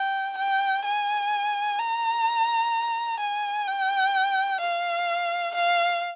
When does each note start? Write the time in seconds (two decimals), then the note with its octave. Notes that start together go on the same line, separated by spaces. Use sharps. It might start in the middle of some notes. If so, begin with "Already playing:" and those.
Already playing: G5
0.38 G5
0.85 G#5
1.79 A#5
3.20 G#5
3.67 G5
4.61 F5
5.55 F5